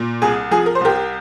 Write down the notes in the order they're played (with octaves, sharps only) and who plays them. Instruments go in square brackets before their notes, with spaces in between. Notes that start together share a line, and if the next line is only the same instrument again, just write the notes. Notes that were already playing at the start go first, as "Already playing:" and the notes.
Already playing: [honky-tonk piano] A#2
C2 G#4
F3 G#4
A#4
C5
C2 G4 A#4